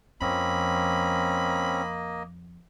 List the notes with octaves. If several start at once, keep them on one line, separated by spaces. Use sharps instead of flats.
F2 A#3 C4 C#4 D#5 B5